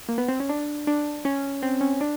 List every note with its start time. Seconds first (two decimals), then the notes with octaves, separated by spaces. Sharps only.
0.09 A#3
0.18 B3
0.28 C4
0.40 C#4
0.49 D4
0.87 D4
1.25 C#4
1.62 C4
1.81 C#4
2.01 D4